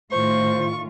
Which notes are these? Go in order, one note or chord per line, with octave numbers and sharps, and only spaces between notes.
A2 D#3 F4 C5 C#6